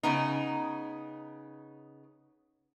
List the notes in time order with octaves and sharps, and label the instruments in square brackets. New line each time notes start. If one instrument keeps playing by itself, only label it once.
[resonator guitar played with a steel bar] C#3 B3 D#4